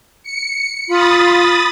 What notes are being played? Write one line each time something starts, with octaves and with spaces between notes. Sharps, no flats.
C#7
F4 B5 D#6 A6